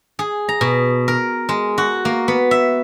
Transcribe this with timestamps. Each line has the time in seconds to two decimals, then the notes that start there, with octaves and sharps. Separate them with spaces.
0.19 G#4
0.49 A#5
0.61 B2
1.08 A#4
1.49 G#3
1.78 F#4
2.05 A#3
2.28 B3
2.51 E5